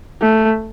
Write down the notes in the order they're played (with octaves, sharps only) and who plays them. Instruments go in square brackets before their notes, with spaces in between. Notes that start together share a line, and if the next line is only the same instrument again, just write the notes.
[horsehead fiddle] A3